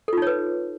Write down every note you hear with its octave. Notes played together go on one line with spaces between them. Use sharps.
D#4 F4 A4 B4 C#5